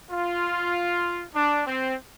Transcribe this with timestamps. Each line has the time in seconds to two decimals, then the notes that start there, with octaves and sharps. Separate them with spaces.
0.11 F4
1.34 D4
1.66 C4